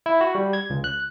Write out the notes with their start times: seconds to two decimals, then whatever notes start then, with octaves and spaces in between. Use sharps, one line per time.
0.06 E4
0.21 F#4
0.35 G3
0.53 G#6
0.70 C#2
0.84 F#6